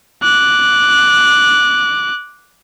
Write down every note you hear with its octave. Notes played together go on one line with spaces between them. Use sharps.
D6 F#6